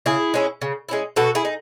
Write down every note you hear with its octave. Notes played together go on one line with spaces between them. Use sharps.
C#3 E4 G#4
G#3 C#4 E4
C#3
G#3 C#4 E4
B2 F#4 A4
E4 G#4
D#4